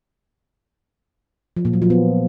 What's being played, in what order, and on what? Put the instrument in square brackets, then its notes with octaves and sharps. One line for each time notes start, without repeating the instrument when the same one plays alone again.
[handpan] F3
A#2
F#3
F3
B3